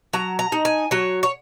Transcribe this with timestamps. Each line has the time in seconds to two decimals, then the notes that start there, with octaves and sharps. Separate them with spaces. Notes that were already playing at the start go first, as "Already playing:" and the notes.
0.13 F#3 A#5
0.39 A#5
0.52 D#4
0.65 G#5
0.91 F#3 C#5
1.23 C#5